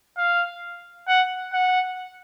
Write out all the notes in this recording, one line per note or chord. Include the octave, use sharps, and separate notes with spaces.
F5
F#5
F#5